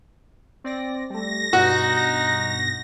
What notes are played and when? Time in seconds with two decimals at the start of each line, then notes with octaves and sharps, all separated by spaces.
0.64 C4 D5 A#6
1.10 G3 A3 A#6
1.53 G2 B2 D#4 F#4